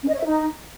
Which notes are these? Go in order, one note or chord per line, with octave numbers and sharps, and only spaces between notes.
C#4
D#5
C#5
E5
D#4